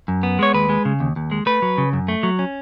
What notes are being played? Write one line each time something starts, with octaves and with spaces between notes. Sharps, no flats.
F#2
B3
G#3 C#5
D#2 B4
G#3
C#3
D#2
D#2
G#3
A3 B4
F#3
C#3
F#2
A3
F#3
C#4